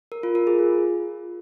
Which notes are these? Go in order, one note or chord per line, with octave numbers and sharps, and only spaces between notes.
A#4
F4
A#4
G#4
F4